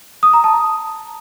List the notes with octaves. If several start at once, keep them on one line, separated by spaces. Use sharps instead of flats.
D#6
A#5
A5